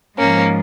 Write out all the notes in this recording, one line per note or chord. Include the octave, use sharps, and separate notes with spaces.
G#2 F3 G#3 A#3 C#4